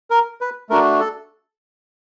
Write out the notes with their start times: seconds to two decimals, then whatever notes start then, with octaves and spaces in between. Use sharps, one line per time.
0.10 A#4
0.41 B4
0.69 A3 D4 F#4 A#4
1.00 A4